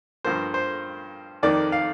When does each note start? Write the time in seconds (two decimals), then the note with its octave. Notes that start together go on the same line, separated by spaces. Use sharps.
0.25 G2 F3 A#3 C5
0.54 C5
1.43 F2 D#3 A#3 D5
1.72 F5